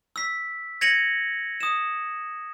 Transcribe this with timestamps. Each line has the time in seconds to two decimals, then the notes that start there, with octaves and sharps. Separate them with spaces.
0.16 E6 B6
0.81 G#6 A#6 C#7 D#7 F7 F#7
1.61 D#6 E7